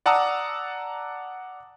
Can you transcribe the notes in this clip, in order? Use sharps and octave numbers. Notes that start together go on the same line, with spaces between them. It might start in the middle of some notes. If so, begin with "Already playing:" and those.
D5 F#5 A5 A#5 D#6 E6